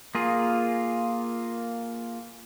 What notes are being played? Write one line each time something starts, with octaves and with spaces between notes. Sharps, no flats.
A#3 F4 G#4